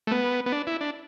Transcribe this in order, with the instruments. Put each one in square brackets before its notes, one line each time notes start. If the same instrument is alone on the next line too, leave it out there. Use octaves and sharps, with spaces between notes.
[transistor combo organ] A3
B3
B3
D4
E4
D4